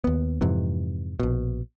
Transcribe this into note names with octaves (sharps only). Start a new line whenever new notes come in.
D#2 B3
F2 G#2 C3 E3
A#1 B2